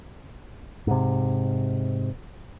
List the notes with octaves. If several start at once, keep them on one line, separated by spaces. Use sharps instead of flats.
G#2 C3